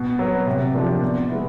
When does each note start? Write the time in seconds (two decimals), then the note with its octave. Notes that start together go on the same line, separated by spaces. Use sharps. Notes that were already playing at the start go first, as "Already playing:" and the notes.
Already playing: B2
0.19 F#3 B3
0.47 C3
0.75 F3 A#3 D4 G4
1.02 B2
1.29 G#3 B3 E4